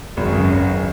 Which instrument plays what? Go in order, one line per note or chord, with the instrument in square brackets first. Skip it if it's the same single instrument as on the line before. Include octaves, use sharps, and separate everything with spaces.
[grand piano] G#1 [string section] C#2 F#2 C#3